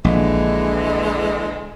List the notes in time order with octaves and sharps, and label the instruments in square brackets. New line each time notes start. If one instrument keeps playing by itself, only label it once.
[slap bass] A#1 [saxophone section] D3 E3 G#3